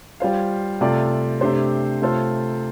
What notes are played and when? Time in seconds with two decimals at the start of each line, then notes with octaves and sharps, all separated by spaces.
0.20 G3 F4 C5 F5
0.81 C3 A3 F4 A4 D5
1.41 C3 A3 D4 G4 C5
2.01 C3 A3 F4 A4 C5